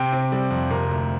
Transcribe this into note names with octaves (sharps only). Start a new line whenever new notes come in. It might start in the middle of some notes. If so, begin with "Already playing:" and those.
Already playing: C3 G5
C4
G3
F2
C3 A#4
D2